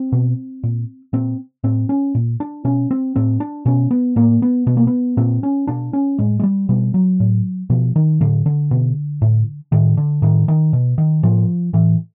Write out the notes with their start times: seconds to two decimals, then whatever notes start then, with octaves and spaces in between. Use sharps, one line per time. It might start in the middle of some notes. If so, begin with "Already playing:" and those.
Already playing: C4
0.12 B2
0.63 A#2
1.13 A#2 C4
1.64 A2 C4
1.89 C#4
2.15 A#2
2.40 D4
2.65 B2 C#4
2.91 C4
3.16 A2 C4
3.40 D4
3.66 B2 C#4
3.91 B3
4.16 A2 A#3
4.42 B3
4.67 B2 B3
4.77 A#3
4.87 B3
5.17 A#2 C4
5.43 C#4
5.67 B2 D4
5.93 C#4
6.19 A2 G#3
6.40 G#3
6.43 G3
6.69 B2 G3
6.94 F#3
7.20 A2
7.70 B2 F3
7.96 D#3
8.20 A2 D3
8.46 D3
8.71 B2
9.22 A2
9.72 A2 D#3
9.97 D3
10.22 A2 D#3
10.48 D#3
10.73 B2
10.98 D#3
11.23 A2 F3
11.73 A2 E3